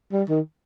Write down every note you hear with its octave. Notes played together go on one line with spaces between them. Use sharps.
G3
D#3